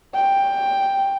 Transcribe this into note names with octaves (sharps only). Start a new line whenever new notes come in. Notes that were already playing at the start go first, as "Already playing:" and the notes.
G5